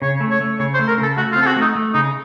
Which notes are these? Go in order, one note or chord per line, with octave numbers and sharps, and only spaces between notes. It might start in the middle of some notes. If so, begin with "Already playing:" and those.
C#3 C#5
A3
C#5
A3
C#3 C#5
C5
A3
A#4
C#3 A4
A3 F#4
F4
C4
A4
F#4
A3 D#4
A3
C#3 D#4